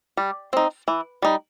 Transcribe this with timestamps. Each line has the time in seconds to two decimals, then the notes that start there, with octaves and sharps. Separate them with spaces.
0.17 G3
0.53 C4 D#4
0.88 E3
1.22 G3 D#4